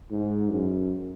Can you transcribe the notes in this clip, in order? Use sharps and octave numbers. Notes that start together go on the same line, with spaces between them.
G#2
F#2